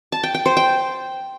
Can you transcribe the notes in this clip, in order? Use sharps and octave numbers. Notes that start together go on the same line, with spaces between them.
A5
G5
G5
C5
G5